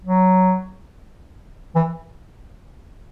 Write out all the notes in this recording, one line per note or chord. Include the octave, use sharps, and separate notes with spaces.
F#3
E3